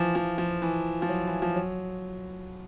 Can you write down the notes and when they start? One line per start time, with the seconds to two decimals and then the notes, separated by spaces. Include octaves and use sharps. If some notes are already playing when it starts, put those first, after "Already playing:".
Already playing: E3 F3
0.15 F3
0.38 F3
0.62 E3
1.02 F3
1.09 F#3
1.27 E3
1.42 F3
1.55 F#3